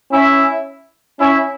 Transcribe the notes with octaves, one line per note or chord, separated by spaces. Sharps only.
C#4 E4
C#4 E4